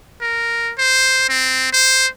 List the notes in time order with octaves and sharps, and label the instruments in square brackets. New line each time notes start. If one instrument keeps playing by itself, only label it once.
[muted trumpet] A#4
C5
C4
C5